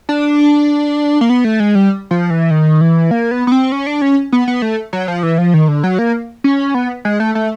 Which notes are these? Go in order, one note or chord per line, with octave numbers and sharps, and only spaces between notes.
D4
A#3
B3
A3
G#3
G3
F3
E3
D#3
E3
A#3
B3
B3
C4
C#4
D4
C#4
B3
B3
A3
F#3
F3
E3
F3
D#3
D3
F#3
A#3
C#4
B3
G#3
A3
A3